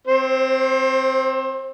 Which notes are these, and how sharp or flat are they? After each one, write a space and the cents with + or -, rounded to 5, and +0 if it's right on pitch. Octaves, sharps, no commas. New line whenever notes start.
C4 +0 C5 +30